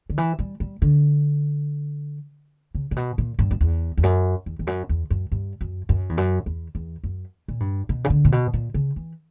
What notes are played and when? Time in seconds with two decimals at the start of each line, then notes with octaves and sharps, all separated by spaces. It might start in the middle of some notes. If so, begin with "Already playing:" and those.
0.10 D3
0.18 E3
0.39 G3
0.60 G3
0.82 D3
2.75 C#3
2.91 A#2
2.96 B2
3.18 A#2
3.39 G2
3.51 F#2
3.61 E2
3.97 E2
4.03 F#2
4.46 E2
4.59 E2
4.67 F#2
4.89 E2
5.10 F#2
5.32 G2
5.61 F#2
5.89 F#2
6.09 E2
6.17 F#2
6.46 E2
6.75 E2
7.04 F#2
7.48 A#2
7.60 G2
7.89 B2
8.04 C#3
8.10 D3
8.25 A#2
8.32 B2
8.54 A#2
8.74 C#3
8.96 E3